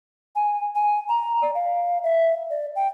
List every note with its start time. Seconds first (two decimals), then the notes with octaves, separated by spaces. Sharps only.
0.36 G#5
0.75 G#5
1.09 A#5
1.42 D5
1.55 F5
2.04 E5
2.50 D5
2.76 G5